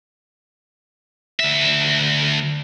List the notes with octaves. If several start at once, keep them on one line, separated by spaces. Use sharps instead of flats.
D2 E5